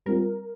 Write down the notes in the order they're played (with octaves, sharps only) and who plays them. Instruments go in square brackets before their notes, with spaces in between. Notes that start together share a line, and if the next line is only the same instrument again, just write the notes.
[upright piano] G3 C4 F4 [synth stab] A#4